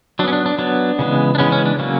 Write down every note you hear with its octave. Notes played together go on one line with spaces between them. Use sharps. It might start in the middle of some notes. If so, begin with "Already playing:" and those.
F#3 B3 C#4 D4
D4
D4
F#3 B3 D4
C#3 E3 G#3 B3
D4
C#3 E3 G#3 B3 C#4
C#4
D4
C#3 F#3 A#3 C#4